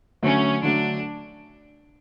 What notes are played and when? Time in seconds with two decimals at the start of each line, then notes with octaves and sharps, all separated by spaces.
0.22 D3 F#3 A3 C#4
0.63 D3 F#3 A3 D4